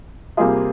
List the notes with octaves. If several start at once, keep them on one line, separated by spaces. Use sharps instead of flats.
C3 G3 A#3 F4 G#4